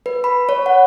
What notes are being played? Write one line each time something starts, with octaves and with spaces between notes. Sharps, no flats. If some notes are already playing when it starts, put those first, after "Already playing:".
B4
B5
C#5
F#5